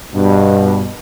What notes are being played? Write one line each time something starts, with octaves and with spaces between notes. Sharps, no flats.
G2 B2